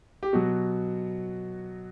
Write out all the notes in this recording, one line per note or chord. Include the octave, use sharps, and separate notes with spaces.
G4
B2 F#3 F#4